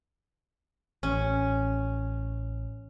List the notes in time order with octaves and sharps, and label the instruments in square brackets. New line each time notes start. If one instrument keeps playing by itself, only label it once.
[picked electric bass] A1 [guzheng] C#4